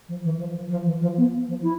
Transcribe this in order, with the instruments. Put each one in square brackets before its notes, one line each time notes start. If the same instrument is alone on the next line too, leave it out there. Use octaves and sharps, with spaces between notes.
[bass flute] F3
E3
F3
F3
F3
E3
F3
B3
F3
E4